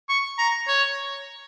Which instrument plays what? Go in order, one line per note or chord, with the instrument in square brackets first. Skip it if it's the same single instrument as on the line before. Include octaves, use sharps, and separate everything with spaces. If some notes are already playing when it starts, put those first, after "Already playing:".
[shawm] C#6
A#5
C#5